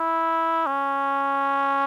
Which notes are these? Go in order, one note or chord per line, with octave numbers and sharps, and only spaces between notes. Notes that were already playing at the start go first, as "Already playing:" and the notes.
Already playing: E4
C#4